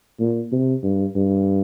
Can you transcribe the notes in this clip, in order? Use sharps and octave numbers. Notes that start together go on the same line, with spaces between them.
A#2
C3
G2
G2